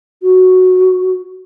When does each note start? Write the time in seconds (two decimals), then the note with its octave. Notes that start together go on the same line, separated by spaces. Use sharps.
0.23 F#4